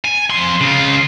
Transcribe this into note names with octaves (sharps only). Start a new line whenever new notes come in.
G#5
F2 C6
C#3 F4